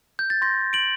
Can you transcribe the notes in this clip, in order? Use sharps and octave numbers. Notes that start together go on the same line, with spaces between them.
G6
A6
C6 G6 A#6
D7 F#7